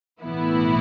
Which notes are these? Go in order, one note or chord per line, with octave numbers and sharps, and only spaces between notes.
B1 A2 E3 B3 E4